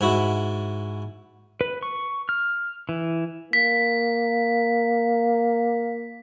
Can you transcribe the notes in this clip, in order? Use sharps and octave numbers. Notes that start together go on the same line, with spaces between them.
G#2 E4 F#4
B4
C#6
F6
E3
A#3 B6